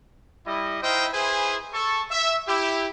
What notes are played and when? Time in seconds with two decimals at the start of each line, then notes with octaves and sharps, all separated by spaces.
0.45 G3 E4 D#5
0.82 D#4 E4 C5 D#5 F5 G5
1.13 E4 G#4 B4 C5 G#5
1.73 A4 C#6
2.11 E5
2.48 E4 G4